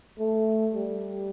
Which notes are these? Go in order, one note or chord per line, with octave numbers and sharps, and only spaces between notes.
A3
G3